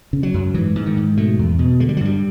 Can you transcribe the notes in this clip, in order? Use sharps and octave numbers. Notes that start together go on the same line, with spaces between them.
C#3
F#3
F#2
G#2 E3
G#2
D#3
G#2
B2 A3
E2
B2
D3 G#3
G3
F#3
G2 G3